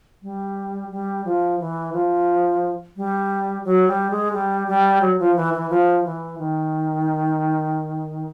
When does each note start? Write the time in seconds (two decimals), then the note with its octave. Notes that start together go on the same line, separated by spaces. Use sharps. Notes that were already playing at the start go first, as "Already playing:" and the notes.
0.22 G3
0.91 G3
1.25 F3
1.60 E3
1.93 F3
2.97 G3
3.64 F#3
3.88 G3
4.11 G#3
4.33 G3
4.68 G3
5.01 F#3
5.19 F3
5.36 E3
5.54 E3
5.70 F3
6.05 E3
6.38 D#3